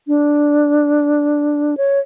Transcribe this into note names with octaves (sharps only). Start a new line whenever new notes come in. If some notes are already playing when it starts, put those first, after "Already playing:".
D4
C#5